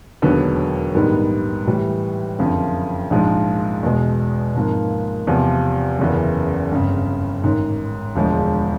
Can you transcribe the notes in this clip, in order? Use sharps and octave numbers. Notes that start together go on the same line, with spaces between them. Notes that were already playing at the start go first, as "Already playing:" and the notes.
E1 D#2 D3 F#3 B3
A#1 G#2 D#3 G3 B3
A2 E3 G3
F#1 F2 D3 F3
A#1 G#2 F3 G#3
E2 B2 G#3
G#1 G#2 F3 A#3
E2 C3 F3
F#1 E2 C#3 E3
G1 F2 C#3
A1 G#2 D#3
E1 D2 D3 F3 G#3